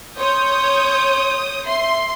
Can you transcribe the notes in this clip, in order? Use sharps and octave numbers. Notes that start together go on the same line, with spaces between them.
C#5 C6 D#6 G6
E5 C6